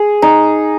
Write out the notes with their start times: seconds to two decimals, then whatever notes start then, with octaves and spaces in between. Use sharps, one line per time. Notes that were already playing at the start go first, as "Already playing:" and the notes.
Already playing: G#4
0.22 D#4